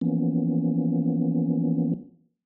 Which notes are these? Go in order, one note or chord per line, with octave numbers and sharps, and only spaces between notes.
E3 F3 A#3 B3 C#4